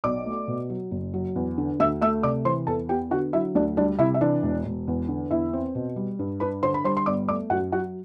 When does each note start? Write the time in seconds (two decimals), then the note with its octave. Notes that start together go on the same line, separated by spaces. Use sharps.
0.04 B1 D5 D6
0.26 A3
0.48 B2
0.70 F#3
0.91 F#1
1.14 F#3
1.36 E2
1.58 D3
1.80 D2 E5 E6
2.01 A3 E5 E6
2.23 C3 D5 D6
2.45 E3 C5 C6
2.67 E2 A4 A5
2.89 B3 G4 G5
3.11 D3 F#4 F#5
3.33 F#3 E4 E5
3.55 D2 D4 D5
3.77 G3 D4 D5
3.99 C3 E4 E5
4.14 E5
4.21 E3 D4 D5
4.43 E1
4.65 E1
4.88 E2
5.08 D3
5.31 E2 E4 E5
5.53 C4
5.75 B2
5.96 G3
6.19 G2
6.40 D4 B4 B5
6.63 D3 C5 C6
6.74 B5
6.84 G3 C5 C6
6.97 C6
7.06 G1 D5 D6
7.28 A3 D5 D6
7.50 F#2 F#4 F#5
7.72 F#3 F#4 F#5